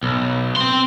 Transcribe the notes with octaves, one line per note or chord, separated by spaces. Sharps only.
B1
C4 C6